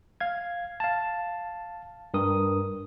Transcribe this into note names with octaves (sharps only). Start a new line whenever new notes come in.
F5 G#6
F5 A5
G2 A#4 D#6